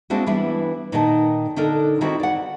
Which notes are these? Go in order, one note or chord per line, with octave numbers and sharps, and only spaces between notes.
G#3 A#3 C4 D4 E4 F#4
E3 G3 B3 D4 E4
A#2 D#3 D#4 A#4 G#5 A5
D3 D4 D#4 A4 A#4
D#3 C4 E4 F#4
D5 F#5